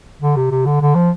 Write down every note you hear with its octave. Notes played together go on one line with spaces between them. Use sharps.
D3
C3
C3
D3
D3
F3